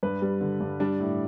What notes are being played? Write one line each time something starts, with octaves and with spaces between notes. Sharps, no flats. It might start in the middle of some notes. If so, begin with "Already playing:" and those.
G2 B4
G3
D3
G2
G3 D4
A2